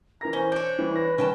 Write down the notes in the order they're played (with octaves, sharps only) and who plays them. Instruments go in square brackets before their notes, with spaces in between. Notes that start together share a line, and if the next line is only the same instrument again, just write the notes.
[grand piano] E3 A#4 A#6 [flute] A#5
[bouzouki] C#4 [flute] C5
[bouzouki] D4 C#5 [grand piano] G6
[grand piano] E3 G3
[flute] B4 [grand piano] B5 A#6
[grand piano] G2 D#3 [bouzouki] C#4 G5 A5 [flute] B4